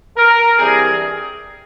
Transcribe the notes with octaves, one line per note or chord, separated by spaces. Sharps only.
A#4
G2 E3 G3 C4 G#4